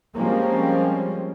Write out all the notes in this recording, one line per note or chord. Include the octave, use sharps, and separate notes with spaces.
F3 G3 G#3 A#3 C4 C#4